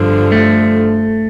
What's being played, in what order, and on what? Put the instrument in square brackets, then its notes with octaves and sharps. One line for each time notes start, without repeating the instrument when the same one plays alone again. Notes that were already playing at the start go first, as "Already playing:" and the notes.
Already playing: [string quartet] G2 D3 F3
[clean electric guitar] A3